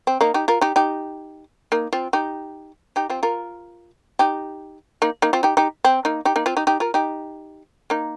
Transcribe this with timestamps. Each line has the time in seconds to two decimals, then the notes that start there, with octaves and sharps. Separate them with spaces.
0.07 C4
0.21 A#3 D#4
0.34 D#4 G4
0.48 F4 A#4
0.61 D#4 G4
0.76 D#4 G4
1.72 A#3 D#4
1.93 C4 F4
2.13 D#4 G4
2.96 D#4 G4
3.10 C4 F4
3.23 F4 A#4
4.19 D#4 G4
5.02 A#3 D#4
5.22 A#3 D#4
5.33 C4 F4
5.43 D#4 G4
5.57 D#4 G4
5.84 C4
6.05 A#3 D#4
6.25 D#4 G4
6.36 A#3 D#4
6.46 C4 F4
6.57 D#4 G4
6.67 D#4 G4
6.80 F4 A#4
6.94 D#4 G4
7.90 A#3 D#4